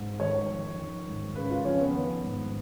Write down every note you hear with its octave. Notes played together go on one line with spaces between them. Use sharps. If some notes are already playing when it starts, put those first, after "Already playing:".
Already playing: G#2
D#3 C#5
F2
D#3
G#2
C#3 B4
F4
F2 C#4
B3
D#3
G#2